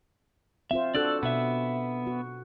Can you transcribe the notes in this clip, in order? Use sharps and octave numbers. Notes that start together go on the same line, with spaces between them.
C4 F4 C5 E5
D4 F#4 A4 D5 E6 F#6
B2 B3 E5
F#4